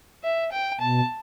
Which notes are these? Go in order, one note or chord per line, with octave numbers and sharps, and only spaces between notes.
E5
G5
B2 A5